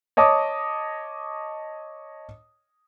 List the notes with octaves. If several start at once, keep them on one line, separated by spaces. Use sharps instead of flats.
C#5 D#5 A5 D6 D#6